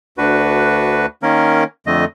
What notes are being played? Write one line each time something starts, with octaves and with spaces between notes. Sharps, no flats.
D2 D4 F#4 B4
D#3 A#3 C#4 A#4
F2 D3 A3 D#5